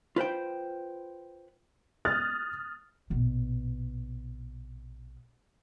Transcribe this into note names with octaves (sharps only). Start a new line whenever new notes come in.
F4 B4 C5 G5
D#6 F6 F#6 A6
A#1 B2